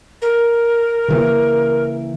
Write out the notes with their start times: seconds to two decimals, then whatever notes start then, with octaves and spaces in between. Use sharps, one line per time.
0.22 A#4
1.08 C#3 E3 A#3